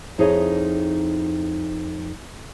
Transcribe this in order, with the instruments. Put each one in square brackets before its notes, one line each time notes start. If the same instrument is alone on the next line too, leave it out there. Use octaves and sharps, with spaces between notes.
[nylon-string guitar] F2 D#4 E4 G#4 C#5